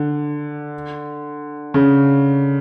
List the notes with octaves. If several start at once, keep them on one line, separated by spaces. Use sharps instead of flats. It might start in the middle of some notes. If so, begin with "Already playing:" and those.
Already playing: D3
C#3